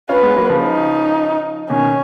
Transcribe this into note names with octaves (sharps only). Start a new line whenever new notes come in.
C#4 F4 B4
G#3 B3
F#3 A#3
C#3 F3
D#4
B2 D#3 C#4